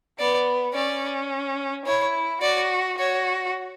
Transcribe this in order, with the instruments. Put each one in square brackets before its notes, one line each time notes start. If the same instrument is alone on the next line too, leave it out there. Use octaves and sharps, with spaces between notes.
[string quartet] B3 [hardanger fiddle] D5
[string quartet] C#4 [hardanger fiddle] D5
[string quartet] E4 [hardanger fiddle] C#5
[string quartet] F#4 [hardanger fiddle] D5
[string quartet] F#4 [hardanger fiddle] C#5